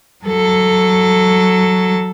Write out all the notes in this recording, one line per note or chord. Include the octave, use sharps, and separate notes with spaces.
F#3 A4